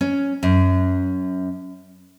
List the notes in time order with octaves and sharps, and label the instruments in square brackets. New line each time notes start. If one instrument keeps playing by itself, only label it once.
[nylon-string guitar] C#4
F#2